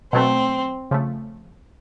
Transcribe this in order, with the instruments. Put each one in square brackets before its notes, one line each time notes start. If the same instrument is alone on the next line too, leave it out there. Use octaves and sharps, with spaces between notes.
[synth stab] B2 F#3 A3 [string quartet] C4
[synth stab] C#3 F3 A3